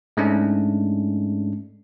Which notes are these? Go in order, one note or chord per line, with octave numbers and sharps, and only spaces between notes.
G#2 G#3 A3 C#4 D4